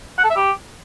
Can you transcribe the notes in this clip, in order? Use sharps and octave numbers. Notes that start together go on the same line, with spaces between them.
F#5
A4
E5
G4